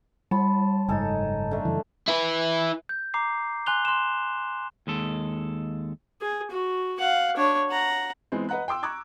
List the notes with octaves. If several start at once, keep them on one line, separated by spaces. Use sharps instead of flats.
G3 C#5 A5 B5
F#1 G#2 D#4 A4 G#5
D3 A3
F#2 C#3 E3
E4 B4
G6
A#5 D6 C7
G#5 C6 F#6 F7 G7
C6 E7
D#2 G#3 A4
G#4
F#4
F5 F#5
D4 C#5
F#5 A#5
E3 G#3 B3 C4
B4 D#5 F#5 A#5 F#6
G5 C6 D6 E6
A#5 C#6 D6 F#6 G#6